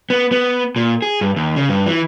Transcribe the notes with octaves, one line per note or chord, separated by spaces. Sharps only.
B3
B3
A#2
G#4
G2
D#2
C#3
G2
E3